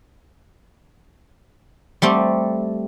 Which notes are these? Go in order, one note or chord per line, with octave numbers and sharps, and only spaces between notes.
G3 A3 C4